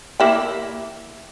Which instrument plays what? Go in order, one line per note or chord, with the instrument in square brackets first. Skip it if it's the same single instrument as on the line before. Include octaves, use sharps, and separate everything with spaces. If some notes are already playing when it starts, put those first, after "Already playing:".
[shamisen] A#3 E4 G4